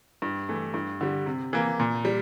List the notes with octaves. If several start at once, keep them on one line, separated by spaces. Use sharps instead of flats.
G2
E3 A3
G2
D3 G3
C3
E3 A#3
A#2
G3